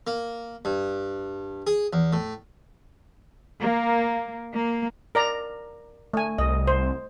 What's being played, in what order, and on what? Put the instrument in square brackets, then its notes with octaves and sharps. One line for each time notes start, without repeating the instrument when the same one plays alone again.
[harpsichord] A#3
G2
G#4
E2
A2
[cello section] A#3
A#3
[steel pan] A#4 D5 A#5
A3 G#5
[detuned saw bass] C2 [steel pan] D#5
[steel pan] C5